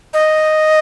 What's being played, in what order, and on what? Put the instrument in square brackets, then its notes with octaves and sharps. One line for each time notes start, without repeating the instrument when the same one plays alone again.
[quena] D#5